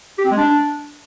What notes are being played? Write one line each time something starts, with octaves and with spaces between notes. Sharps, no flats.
G4
C4
G#3
D4